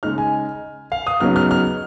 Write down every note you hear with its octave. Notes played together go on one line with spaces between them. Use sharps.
C#3 G#3 D#4 F6
G#5
F5
D#6
C#3 F#3 B3 D#4 F6
F6
F6